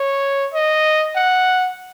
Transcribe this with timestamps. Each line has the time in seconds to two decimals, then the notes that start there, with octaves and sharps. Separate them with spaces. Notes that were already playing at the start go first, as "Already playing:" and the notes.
Already playing: C#5
0.53 D#5
1.15 F#5